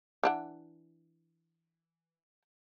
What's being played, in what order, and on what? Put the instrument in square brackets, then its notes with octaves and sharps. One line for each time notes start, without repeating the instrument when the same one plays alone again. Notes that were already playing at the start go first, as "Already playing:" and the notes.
[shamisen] E3 D4 F#5